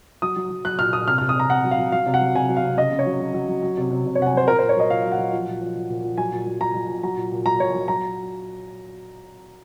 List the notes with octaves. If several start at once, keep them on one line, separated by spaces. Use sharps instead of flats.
F#3 D#6
F#3
F#3
F#3 F#6
A#2 F6
A#2 D#6
C3 F6
F6
C3
D#6
C3 A#5
C3 F#5
F#3
F5
F#3
F#3 F5
C3
F#5
F#3
C3 G#5
F#3
F5
C3
C#3 D#5
C#3
C#5
F#3
F#3
F#3
F#3
F#3
C3
C3
C3
C#5
C3 F#5
G#5
F#3 C5
A#2 A#4
C5
A#2
C#5
F#3 D#5
A#2 F5
F#3
F#5
F#3
F3
A#2
F3
A#2
A#2
F3
F#3 G#5
A#2
F#3
F#3 A#5
F#3
A#2
F#3 A#5
A#2
A#2
F#3 A#5
A#2 C#5
F#3
F#3 A#5